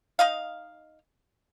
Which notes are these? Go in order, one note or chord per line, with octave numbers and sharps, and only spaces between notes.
D#4 D#5 F5